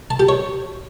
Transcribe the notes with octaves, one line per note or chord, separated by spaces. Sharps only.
A5
G4
C#5